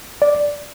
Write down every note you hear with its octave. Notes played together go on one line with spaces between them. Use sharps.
D5